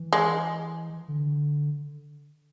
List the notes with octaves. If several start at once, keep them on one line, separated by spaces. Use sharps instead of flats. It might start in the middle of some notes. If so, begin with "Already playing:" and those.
Already playing: E3
G#3
D3